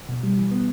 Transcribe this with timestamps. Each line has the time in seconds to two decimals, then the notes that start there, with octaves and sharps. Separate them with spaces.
0.09 B2
0.23 G3
0.37 E3
0.51 B3